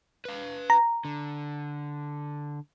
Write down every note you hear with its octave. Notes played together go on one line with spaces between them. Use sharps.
B4 F5
A#5
D3